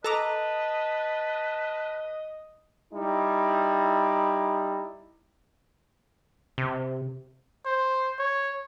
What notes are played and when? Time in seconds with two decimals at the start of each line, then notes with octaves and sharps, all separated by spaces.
0.04 A4 B4 D#5 A5 A#5 D6
2.93 G3 D#4 E4
6.58 C3
7.65 C5
8.19 C#5